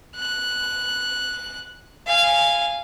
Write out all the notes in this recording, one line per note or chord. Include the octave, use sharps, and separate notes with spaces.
F#6
F5 G#5